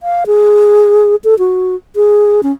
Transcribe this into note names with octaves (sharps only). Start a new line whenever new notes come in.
F5
G#4
A4
F#4
G#4
C#4